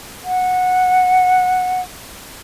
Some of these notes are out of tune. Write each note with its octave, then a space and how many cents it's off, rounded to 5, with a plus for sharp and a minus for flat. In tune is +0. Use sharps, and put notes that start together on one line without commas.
F#5 -15